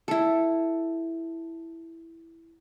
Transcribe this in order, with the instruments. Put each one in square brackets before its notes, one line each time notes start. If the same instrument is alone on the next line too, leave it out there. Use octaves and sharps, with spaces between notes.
[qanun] E4 A4